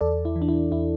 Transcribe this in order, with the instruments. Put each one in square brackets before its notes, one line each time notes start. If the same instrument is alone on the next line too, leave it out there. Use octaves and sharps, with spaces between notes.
[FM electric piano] E2 A4 D5
E4
E3
D4
E4
E2 E4